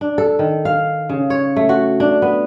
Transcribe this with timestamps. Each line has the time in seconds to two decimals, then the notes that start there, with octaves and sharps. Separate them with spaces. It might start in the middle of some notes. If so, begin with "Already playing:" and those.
0.01 D4
0.18 A4
0.39 D#3
0.65 F5
1.09 C#3
1.30 C#5
1.56 A3
1.69 F#4
2.00 D4
2.22 B3